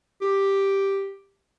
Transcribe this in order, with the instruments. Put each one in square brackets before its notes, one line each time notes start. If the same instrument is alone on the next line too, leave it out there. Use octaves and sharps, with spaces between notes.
[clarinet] G4